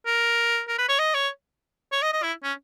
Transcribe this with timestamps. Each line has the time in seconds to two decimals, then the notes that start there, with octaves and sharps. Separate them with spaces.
0.06 A#4
0.68 A#4
0.79 B4
0.89 C#5
0.99 D#5
1.14 C#5
1.92 C#5
2.02 D#5
2.13 D#5
2.23 E4
2.43 C#4